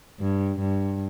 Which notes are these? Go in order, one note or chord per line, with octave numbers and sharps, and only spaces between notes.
G2
G2